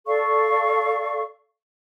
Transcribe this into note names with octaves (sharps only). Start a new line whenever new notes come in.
A4 D5 F5 C#6